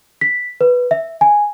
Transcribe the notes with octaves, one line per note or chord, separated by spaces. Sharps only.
B6
B4
E5
G#5